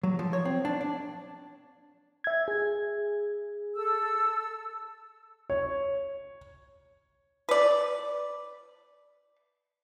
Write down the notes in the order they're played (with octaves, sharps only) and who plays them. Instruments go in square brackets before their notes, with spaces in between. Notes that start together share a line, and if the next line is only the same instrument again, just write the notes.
[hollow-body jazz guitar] F#3
F3
C#5
C4
D4
D4
[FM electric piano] E5 G#6
G#4
[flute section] A4 E6
[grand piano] C#5
[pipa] B4 D5